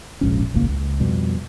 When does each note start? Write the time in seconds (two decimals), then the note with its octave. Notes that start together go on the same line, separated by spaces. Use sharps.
0.21 E1 A#1 G#2 C#4
0.54 D#1 G#1 C#2 A#3
0.69 C#2
1.00 F2 B2 G3